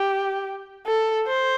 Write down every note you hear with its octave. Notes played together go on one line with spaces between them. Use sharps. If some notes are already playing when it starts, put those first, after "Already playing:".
Already playing: G4
A4
C5